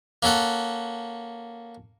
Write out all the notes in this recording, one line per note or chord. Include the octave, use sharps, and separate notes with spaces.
A#3 C#4 A4 F#5